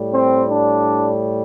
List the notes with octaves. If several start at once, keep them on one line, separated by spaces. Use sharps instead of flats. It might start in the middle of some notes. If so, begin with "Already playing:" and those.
Already playing: A2 G3
C4
D4